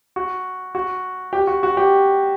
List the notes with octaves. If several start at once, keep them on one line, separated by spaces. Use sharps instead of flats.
F#4
F#4
G4
F#4
F#4
G4